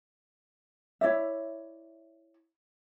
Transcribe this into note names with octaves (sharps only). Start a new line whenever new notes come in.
E4 C#5 D5 E5